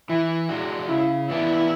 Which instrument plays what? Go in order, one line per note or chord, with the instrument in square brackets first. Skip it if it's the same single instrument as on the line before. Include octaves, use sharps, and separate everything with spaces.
[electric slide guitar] E3 [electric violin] E4
[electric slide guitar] G#3 D4 F#4
[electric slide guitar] C#3 [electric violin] E4
[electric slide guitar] E3 B3 D4 [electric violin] E4